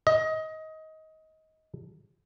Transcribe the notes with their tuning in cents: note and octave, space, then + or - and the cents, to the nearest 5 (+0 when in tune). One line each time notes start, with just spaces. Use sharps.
D#5 +20